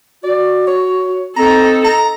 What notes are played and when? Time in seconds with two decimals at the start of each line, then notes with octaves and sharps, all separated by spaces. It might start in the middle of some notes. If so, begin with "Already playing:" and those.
0.23 F#4 D5
0.67 C#5
1.36 C4 D#4 A4 A#5
1.85 A#5